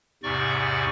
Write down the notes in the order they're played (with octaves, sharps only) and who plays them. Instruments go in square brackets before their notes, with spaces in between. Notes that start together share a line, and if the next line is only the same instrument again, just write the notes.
[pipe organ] E2 G#2 C3 D5 C#6